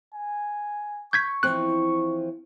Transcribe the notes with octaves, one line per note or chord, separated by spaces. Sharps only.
G#5
C#6 G6 G#6 B6
E3 F3 C4 F#6